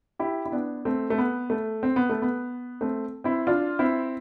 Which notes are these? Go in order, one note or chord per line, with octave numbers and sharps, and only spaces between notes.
E4 G4
E4
B3 D4
A3 C4
A3
B3
A3
C4
B3
A3
B3
A3 C4
C4 E4
D4 F4
C4 E4